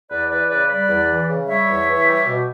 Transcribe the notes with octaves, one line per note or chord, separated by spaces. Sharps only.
E2 B4 D5
E3 B4 D5
C#3 B4 D5
G3 B4 D5
E2
E3
C#3
G3 C#5 E5
E2
E3
G3
B2